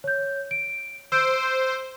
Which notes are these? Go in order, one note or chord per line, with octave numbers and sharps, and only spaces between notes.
C#5 G6
D7
C5 E6 G6 D7